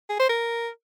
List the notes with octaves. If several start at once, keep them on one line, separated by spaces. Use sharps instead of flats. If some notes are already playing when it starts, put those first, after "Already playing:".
G#4
C5
A#4